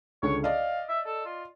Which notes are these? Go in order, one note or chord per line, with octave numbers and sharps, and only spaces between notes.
C#2 D3 C#5
D5 D#5 F5
E5
A4
F4